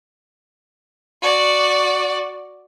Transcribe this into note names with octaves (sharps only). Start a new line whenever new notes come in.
F#4 D5